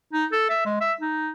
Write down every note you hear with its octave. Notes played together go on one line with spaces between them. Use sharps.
D#4
A4
E5
G#3
E5
D#4